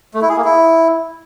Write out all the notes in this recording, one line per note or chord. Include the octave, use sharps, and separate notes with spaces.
A3
E4
G#4
A#3
E4